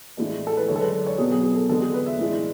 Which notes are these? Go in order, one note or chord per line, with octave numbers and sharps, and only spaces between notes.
A2 E3 G#3 D4
A4
B4
F#2 D3 G#3 C#5
A4
B4
D5
C#5
B2 F#3 B3 G#4
G#4
G#4
A4
D3 G#3 B3 A4
G#4
B4
E5
A2 E3 G#3 D4